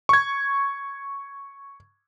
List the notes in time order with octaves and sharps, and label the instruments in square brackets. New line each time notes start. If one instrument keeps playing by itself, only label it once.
[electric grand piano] C#6 G#6